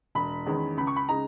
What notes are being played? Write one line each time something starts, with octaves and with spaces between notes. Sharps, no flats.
E1 B5
E2 D#3 G#3 C#4
C#2 B5
C#6
B5
C#3 G#3 D#4 A#5